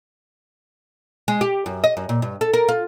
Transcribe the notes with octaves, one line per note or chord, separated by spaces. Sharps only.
G#3
G4
F#2
D#5
F#2
A#2
G2
A4
A#4
F4